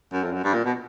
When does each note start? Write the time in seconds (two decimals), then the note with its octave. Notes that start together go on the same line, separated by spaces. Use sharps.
0.13 F#2
0.23 F2
0.33 F#2
0.44 G2
0.54 A#2
0.65 B2